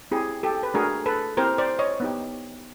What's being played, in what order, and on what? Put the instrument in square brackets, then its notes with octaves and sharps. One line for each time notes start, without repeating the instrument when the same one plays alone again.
[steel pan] C4 E4 G4 G#4
G4 A4
B4
A3 D4 F#4 G#4 A#4
A4 B4
C4 E4 G4 A#4 C5
C5 D5
C#5 D#5
B3 D#4 G4